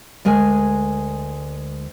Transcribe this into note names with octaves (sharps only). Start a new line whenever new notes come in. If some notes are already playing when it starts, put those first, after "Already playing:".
D2 G#3 A#4 G#5